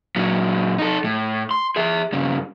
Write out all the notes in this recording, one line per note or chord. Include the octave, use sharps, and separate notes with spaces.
A#2 F#3
D#4 A4
A2
C6
G#4 E5
G2 C#3